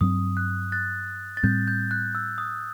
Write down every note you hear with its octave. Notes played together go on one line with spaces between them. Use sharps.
G2 F#3 C4 D#6
F#6
F#6 A6
A6
A2 G3 C4 G6
G6
F#6
E6
D#6